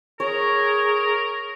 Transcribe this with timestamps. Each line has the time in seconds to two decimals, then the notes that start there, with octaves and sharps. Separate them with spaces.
0.20 G#4 A#4 C#5